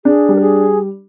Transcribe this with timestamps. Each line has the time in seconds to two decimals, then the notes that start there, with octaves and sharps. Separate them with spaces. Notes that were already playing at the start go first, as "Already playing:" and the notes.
0.05 D4 G#4
0.29 G3
0.36 A#4
0.41 G#4